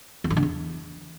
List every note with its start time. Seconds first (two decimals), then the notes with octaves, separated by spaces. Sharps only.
0.24 E2
0.30 G2
0.37 D3
0.43 E2